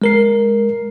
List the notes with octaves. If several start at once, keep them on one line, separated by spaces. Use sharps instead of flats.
G#3 A#4 C7